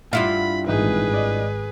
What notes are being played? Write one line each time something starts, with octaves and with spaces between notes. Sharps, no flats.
G2 E4 F4 F#5 B5
G#1 A#2 E3 D#4 G#4 B4
D5 D#5